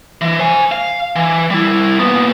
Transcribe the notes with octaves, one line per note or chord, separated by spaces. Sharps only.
E3
C5 G#5
F5
E3
G3 E4
A#2 B3